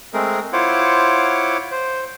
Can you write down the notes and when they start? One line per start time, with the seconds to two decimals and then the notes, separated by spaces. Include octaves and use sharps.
0.14 G#3 A3 C4 G#4 A#4
0.53 E4 F4 C5 C#5 F#5 D6
1.71 C5